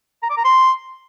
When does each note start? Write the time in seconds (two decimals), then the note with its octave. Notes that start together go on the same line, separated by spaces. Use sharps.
0.23 A#5
0.30 D6
0.37 A#5
0.45 C6